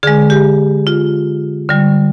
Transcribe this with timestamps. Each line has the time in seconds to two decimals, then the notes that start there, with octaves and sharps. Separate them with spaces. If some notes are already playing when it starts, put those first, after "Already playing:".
0.03 D3 G#3 G#4
0.30 G4
0.87 F4
1.69 D3 G3